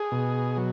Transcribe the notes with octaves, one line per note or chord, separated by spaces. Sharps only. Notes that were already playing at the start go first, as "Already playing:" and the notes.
Already playing: G#4
B2
F#3